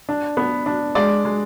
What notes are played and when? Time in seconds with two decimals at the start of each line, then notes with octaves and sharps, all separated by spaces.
0.09 D4
0.37 B3
0.66 D4
0.95 G#3 D5
1.25 G#3